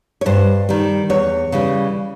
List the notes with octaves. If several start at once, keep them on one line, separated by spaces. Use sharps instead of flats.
C#5
G2 C5
D#3 G3
E2 C#5
C#3 E3 G3